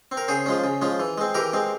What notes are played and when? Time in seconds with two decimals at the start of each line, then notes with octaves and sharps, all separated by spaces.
0.12 C4
0.17 A#4
0.28 C#3 G#4 C5
0.46 F3 G#3 C#4
0.64 C#3
0.82 F3 G#3 C#4
1.00 E3
1.18 G#3 C4
1.35 E3 G4 A#4
1.53 G#3 C4